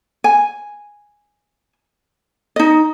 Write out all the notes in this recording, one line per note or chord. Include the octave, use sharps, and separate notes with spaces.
G#5
D#4 D#5